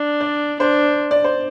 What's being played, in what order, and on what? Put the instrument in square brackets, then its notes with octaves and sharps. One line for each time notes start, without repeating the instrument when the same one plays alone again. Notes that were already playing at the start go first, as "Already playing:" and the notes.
Already playing: [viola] D4
[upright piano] D5
[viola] D4 [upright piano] C5
[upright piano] D5
C5